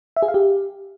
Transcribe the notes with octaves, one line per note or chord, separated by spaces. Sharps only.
E5
G#4
F5
G4